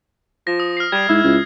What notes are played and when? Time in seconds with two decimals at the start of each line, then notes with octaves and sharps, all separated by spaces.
0.47 F3 A#6
0.60 D#6
0.77 F6 A#6 C7
0.92 G3 G#6
1.09 G#2 E4
1.24 C#2